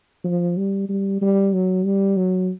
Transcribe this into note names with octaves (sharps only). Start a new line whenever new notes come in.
F3
G3
G3
G3
F#3
G3
F#3